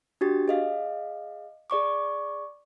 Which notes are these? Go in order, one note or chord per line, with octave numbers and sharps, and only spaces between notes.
D4 F#4 G4 A6
G#4 D#5 F5
G#4 D5 C#6 D6